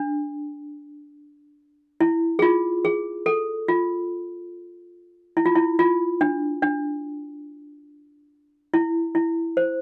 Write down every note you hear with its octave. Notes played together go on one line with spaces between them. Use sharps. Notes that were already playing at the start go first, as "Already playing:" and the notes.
Already playing: D4
E4
G#4
F4
G#4
A4
F4
E4
F4
E4
F4
D4
D4
E4
E4
C5